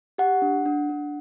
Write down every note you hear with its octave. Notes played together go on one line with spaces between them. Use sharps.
G4 F#5
D4
D4
D4